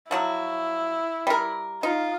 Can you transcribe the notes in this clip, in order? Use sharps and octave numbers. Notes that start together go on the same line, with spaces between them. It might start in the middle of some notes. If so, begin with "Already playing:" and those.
F3 F#3 E4 F#4
G3 A#4
D#4 F4